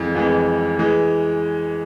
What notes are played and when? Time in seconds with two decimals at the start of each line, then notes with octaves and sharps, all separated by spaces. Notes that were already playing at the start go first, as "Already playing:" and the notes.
Already playing: F2 E3 G#3
0.15 F2 E3 G#3
0.79 E3 G#3